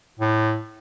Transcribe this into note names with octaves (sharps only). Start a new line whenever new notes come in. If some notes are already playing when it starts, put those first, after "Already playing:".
A2